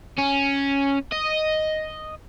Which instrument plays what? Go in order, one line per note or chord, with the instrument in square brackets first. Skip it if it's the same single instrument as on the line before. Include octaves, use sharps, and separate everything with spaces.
[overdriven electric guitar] C#4
D#5